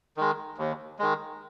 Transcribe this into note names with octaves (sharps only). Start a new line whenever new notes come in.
D#3 G#3
D#2
D#3 G#3